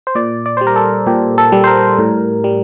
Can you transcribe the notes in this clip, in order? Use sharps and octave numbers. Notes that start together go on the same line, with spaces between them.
C5
A#2 D5
D5
G3 C5
A#4
A4
A#2 G4
A4
G3
C5
A#4
A2
G3